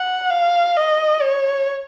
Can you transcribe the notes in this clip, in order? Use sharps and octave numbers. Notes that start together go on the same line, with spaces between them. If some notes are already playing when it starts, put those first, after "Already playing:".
Already playing: F#5
F5
D#5
C#5